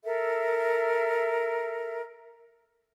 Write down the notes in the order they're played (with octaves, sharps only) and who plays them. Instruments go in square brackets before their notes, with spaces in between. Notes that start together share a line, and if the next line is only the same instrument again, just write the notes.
[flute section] A4 A#4 E5